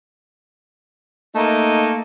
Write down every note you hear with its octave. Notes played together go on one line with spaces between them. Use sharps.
A3 A#3 D#4